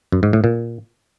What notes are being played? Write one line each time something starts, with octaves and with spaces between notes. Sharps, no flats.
F#2
G#2
A2
A#2